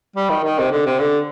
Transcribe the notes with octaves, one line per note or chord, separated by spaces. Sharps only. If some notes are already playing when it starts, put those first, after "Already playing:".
G3
D#3
D#3
C3
D3
C3
D3